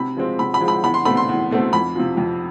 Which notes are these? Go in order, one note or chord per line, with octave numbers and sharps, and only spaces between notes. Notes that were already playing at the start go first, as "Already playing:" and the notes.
Already playing: C3 B5
F3 G#3 C4
C3 B5
B5
F3 G#3 C4
B5
E2 B5
C6
B2 A3 C4 B5
C6
E2
B2 A3 C4
F2 B5
C3 F3
F2